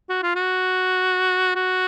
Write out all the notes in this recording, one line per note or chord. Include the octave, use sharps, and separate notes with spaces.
F#4
F4
F#4
F#4